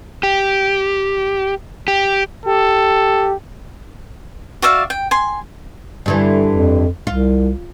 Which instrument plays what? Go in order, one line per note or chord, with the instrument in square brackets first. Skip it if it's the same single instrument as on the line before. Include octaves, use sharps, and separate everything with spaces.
[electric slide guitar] G4
G4
[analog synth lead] G4 [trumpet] A4
[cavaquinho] F#4 D5 E5 F5
G5
G#5 C6
[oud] G2 D3 E3
[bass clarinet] F2
[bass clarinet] C2 [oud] F4